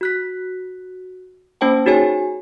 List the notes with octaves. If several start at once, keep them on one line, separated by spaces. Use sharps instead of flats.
F#4 F#6 B6
A#3 C#4 C5 G5 A5
D#4 F#4 G#4 C#5 G#5